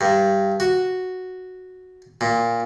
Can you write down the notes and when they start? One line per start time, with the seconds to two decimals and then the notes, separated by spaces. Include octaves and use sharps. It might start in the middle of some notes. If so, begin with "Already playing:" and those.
0.01 G2
0.60 F#4
2.21 A#2